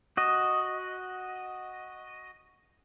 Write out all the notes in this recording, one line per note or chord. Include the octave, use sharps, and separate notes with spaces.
F#4 D#5